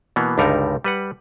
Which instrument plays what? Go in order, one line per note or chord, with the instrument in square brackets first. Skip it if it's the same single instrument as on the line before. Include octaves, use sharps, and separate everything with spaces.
[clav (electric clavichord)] B2 E3 A#3 B3
C#2 G2 D3 G3 D#4 A#4
G3 B4 F#5